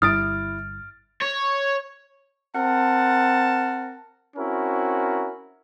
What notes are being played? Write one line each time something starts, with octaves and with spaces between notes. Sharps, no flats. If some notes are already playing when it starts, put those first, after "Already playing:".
G1 G3 E4 D#6 F6 A6 D7
C#5
C4 A#4 F#5 A5
C4 C#4 E4 F#4 A#4